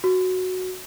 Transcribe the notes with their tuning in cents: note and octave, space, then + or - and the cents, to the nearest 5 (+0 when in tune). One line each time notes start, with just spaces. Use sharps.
F#4 +0